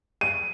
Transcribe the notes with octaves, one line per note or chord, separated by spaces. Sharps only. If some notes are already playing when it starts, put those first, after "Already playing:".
D#7